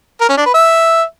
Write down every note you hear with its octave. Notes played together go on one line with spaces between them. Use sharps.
A#4
C#4
D4
B4
E5